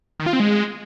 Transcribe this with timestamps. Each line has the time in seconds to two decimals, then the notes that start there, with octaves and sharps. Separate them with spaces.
0.20 D#3
0.26 F4
0.33 C4
0.40 G#3